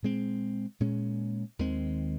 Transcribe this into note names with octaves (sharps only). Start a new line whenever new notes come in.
A#2 G#3 C4
A#2 G#3 C#4
D#2 D#3 G#3 C4